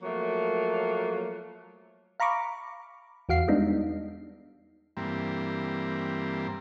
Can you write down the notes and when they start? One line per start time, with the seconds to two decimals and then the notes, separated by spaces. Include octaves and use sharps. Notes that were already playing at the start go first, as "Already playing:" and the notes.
0.03 F3 F#3 A3 A#3
2.20 F5 A#5 B5 C#6 D6
3.29 E2 F#4 F5 C7
3.48 G3 G#3 B3 D4 D#4
4.97 G2 E3 G3 A#3 C4